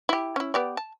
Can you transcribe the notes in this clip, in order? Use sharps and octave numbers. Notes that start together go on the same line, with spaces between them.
E4 G4
C#4 E4
B3 G4 D5
A5